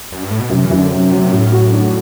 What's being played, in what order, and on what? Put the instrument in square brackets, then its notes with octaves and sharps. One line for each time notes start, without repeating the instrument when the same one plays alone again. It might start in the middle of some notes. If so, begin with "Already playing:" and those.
[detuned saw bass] F#2
G2
A2
B2
[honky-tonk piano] F#2 [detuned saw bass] C3
[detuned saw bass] E3
[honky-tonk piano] F#2
[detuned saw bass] D3
[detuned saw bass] C3 [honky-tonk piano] F#3
[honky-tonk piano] F#3
[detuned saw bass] A2 [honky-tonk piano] F#4
[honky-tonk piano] F#4
D4